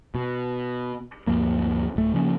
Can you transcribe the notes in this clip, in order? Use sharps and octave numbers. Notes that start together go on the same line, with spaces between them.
B2
D2 G2 F3 A#3
D1 A3
C#3 F3 A#3 C#4